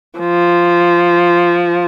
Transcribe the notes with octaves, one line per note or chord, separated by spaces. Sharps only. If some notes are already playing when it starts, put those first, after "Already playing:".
F3